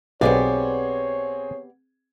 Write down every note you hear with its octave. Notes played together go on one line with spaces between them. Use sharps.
B1 B3 C4 G4 G#4 C#5 D5